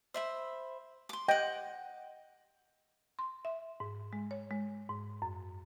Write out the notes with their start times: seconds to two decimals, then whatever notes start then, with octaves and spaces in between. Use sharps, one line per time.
0.14 C5 E5 B5
1.09 C6 D6
1.28 D#5 F#5 G5
3.19 C6
3.45 E5
3.80 G#2
4.13 G#3
4.31 C#5
4.51 G#3
4.89 G#2
5.22 F#2